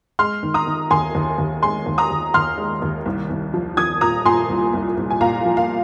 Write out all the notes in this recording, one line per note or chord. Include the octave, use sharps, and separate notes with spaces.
G#3 C6 F6
D#3
A#5 D#6
D#3
D#2 G#5 C6
D#2
D#2
G#3 G#5 C6
D#2
A#5 D#6
D#2
D#2 C6 F6
G#3
D#2
C2
C2
F3
F3 D#6 G#6
A#2 A#5 D#6
A#2 G#5 C6
C2
C2
C2
G#5
A#2 F5 A#5
F3
F5